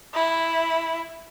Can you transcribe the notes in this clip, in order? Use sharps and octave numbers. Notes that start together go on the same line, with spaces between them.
E4